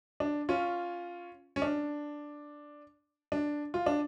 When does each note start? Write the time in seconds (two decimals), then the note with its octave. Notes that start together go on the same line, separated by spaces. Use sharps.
0.20 D4
0.49 C#4 F4
1.56 C#4
1.62 D4
3.32 D4
3.74 F4
3.86 D4